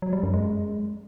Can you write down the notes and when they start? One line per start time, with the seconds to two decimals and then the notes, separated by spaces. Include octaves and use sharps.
0.02 F#3
0.13 G3
0.23 F#2
0.34 G#3